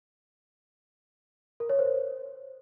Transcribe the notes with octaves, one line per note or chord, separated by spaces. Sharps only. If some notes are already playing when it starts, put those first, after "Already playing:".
A#4
C#5
C5